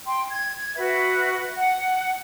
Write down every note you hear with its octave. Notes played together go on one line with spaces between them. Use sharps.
G5 C6
G#6
F#4 B4 E5
F#5